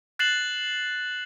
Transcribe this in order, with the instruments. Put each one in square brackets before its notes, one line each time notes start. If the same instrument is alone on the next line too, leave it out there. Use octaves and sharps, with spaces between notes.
[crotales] F#6 A6 C7 E7 F#7